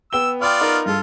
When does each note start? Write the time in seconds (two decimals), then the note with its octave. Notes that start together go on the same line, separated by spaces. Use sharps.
0.13 B3 G5 E6 G7
0.42 B3 F4 D5 G5 F6
0.61 D#4 A#4
0.86 G2 F4 A4